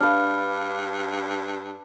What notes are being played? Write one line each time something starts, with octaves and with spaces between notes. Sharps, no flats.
G2 D4 B4 F5 F6